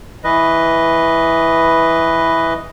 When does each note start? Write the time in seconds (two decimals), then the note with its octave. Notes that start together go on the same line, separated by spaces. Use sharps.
0.24 E3 B4 D#5